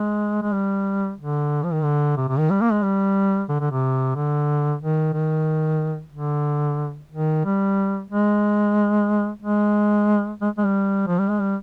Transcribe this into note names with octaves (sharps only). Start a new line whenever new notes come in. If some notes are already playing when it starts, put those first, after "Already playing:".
Already playing: G#3
G#3
G3
D3
F3
D#3
D3
C3
C3
D#3
G3
A#3
G#3
G3
D3
D3
C3
D3
D#3
D#3
D3
D#3
G3
G#3
G#3
G#3
G#3
G3
F3
G3
G#3
G3